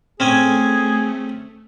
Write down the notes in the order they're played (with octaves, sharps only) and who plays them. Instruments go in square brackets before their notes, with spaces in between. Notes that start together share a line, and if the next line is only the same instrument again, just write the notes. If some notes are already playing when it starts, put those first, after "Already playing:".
[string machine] A3 [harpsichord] C4 C#4 G#5 [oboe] G#4